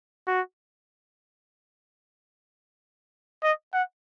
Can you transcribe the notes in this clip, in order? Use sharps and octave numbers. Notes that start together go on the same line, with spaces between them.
F#4
D#5
F#5